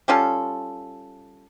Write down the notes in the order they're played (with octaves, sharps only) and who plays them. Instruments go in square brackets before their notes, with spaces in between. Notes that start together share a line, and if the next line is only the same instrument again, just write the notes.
[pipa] G3 C#4 F4 A4